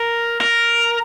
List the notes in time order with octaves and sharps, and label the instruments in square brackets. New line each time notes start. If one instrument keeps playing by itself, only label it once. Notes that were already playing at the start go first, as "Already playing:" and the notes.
Already playing: [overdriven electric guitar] A#4
A#4